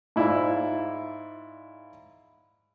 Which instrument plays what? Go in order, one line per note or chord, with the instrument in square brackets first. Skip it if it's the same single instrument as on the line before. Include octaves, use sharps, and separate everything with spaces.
[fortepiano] G#2 E4 F4 D5